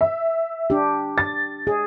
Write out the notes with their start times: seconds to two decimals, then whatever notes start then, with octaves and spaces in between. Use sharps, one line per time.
0.01 E5
0.70 D4 G4
1.18 A6
1.67 G#4